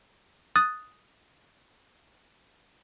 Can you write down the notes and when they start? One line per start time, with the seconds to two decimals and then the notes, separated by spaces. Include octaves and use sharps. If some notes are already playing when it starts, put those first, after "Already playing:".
0.56 D#6 F#6 A6